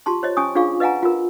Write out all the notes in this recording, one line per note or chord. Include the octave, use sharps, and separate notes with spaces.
F4 G4 A5 C6
C5 C#5 D#5
C#4 G#5 C#6 D#6
D4 F4 G#4 F5 C#6
B4 D#5 F5 F#5 G#5 A#5
F4 A#4